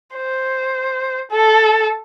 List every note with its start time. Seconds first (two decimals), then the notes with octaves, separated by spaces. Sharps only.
0.15 C5
1.31 A4